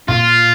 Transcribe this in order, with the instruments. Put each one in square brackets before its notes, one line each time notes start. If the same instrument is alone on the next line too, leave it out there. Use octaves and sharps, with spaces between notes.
[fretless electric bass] A#2 [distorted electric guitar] F4